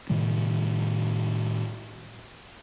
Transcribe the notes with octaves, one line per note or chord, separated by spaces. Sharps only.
A2 C3 D#3 G3